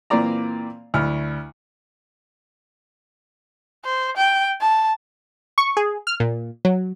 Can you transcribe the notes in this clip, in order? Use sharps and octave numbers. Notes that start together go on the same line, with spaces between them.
A#2 E3 A#3 C4 D5 A#5
D2 E4 F6
C5
G5
A5
C#6
G#4
F6
A#2
F#3